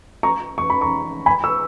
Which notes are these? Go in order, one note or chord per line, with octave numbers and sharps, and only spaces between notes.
A#5 C#6
C#6
B5
A#5 C#6
G#5 B5
C#6 E6